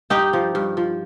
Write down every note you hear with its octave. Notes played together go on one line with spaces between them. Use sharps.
G2 D#4 G4
F3
G2
F3